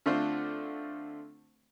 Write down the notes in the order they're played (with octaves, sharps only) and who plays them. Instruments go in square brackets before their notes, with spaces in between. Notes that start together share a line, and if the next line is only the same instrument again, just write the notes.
[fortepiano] D3 A3 C4 D4 F4 C5